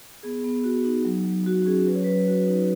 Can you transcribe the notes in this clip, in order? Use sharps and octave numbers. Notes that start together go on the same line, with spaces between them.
B3 G#4
B3
F#4
D#4
F#3
F#3
F#4
F#4
C#4 G#4
F#3 B4
C#5
F#3 B4
F#4
D#4